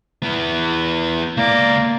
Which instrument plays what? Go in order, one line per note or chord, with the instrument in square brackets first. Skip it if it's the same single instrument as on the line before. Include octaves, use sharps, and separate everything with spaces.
[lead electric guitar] B3 E4
[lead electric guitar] C#2 D5 [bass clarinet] A#3